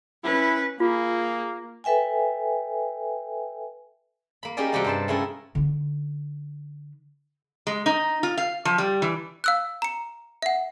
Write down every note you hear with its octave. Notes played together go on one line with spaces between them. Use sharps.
C#4 E4 B4
A#3 F4 G#4
A4 B4 E5 G5 G#5
A#3 B5
C#4 D#4 G4 G#4 A#4 D5
C3 G3 F#4 G4 D5 F5
G2 C5 A5
C#3 A3 E4 F4 G#4 A#4
D3 D#4
G#3
D#4
F4
F5
F3
G3
E3
F5 E6 F#6
A#5 C#7
E5 F#5